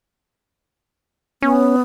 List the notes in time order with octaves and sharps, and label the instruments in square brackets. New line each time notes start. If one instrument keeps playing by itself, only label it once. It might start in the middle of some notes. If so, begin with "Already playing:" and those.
[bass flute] B3 [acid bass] C#4